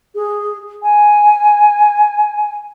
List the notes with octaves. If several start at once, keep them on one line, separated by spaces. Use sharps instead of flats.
G#4
G#5